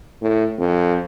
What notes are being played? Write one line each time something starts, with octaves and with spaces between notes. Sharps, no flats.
A2
F2